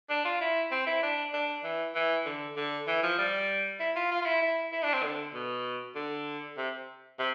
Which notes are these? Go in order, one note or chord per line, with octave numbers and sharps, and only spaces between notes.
D4
F4
E4
C4
E4
D4
D4
E3
E3
D3
D3
E3
F3
G3
E4
F4
F4
F4
E4
E4
E4
D4
C4
D3
B2
D3
C3
C3